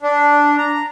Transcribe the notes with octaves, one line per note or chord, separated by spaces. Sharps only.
D4
A#5